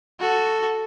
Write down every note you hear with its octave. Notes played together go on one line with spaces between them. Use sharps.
F#4 A4